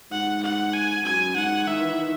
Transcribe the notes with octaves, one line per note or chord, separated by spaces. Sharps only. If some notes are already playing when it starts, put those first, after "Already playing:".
G#2 F#5
F#5
G#5
F#2 G#5
G#2 F#5
D#3 E5
E3
D#3